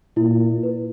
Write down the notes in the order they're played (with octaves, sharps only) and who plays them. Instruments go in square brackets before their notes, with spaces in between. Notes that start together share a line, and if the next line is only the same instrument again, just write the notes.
[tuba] A#2 [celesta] E4
[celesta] E4
B4